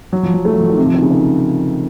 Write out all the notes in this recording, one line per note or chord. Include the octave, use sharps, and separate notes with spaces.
F#3
F3
F#3
A3
F#3
F3
D#3
C3
F3
D#3
C#3
D#3